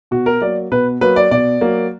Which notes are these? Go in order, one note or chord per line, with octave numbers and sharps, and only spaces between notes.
B2 F#4
A#4
F#3 A#3 D5
B2 B4
F#3 A#3 B4
D5
B2 D5
F#3 A#3